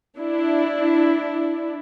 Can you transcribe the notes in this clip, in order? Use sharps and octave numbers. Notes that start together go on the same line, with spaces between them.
D4 E4